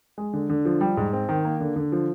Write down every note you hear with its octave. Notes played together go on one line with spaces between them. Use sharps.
G#3
D3
D3
F3
G3
G#2
C4
D#3
A#3
D3
D3
F3